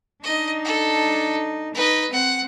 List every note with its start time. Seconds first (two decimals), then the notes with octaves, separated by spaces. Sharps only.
0.23 D4 D#4 D#5
0.65 A4
1.75 D#4 B4 D#5
2.12 C4 F#5